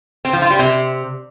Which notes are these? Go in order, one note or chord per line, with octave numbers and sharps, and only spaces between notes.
C4
F3
F4
G3
C3